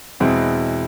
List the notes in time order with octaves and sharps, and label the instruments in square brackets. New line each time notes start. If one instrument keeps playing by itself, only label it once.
[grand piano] E2 B2 G#3 C4 E4